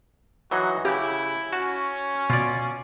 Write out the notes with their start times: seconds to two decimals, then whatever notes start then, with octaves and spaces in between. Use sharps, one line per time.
0.51 E3 F#3 D#4 F#4 C6
0.85 C#3 E4 G4
1.53 C#4 F#4 A5
2.30 B2 F4 D5